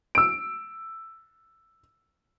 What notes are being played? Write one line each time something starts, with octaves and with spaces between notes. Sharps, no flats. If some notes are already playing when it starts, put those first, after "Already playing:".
E6 D7